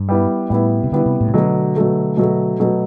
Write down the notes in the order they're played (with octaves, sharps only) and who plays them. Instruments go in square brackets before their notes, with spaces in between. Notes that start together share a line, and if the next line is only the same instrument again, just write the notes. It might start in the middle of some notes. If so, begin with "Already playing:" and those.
Already playing: [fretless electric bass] G2
[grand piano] G3 B3 E4
[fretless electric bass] A2 [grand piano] G3 B3 E4
[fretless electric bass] C3
[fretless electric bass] D3 [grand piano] G3 B3 E4
[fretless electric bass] C3
A2
C3
[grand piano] B2 F#3 A3 [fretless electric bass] D3
[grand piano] B2 F#3 A3
B2 F#3 A3
B2 F#3 A3